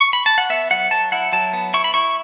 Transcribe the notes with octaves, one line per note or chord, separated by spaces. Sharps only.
C#6
B5
A5
F#5
B3 E5
F#3 F#5
F#3 A5
E4 F#5
F#3 A5
B3
E4 C#6
B5
E4 C#6